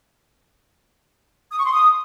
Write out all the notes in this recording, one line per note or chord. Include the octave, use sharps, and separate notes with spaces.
D#6
C#6
C6
D#6